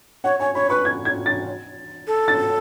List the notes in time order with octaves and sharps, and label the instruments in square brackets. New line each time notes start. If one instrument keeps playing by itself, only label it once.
[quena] C#5 [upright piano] F#5
[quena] C#5 [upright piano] G#5
[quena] C#5 [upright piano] B5
[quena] B4 [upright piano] C#6
[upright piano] G#6
G#6
A6
[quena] A4
[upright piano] A6